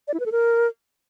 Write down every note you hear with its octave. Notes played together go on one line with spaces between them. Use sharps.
D5
E4
B4
A4
A#4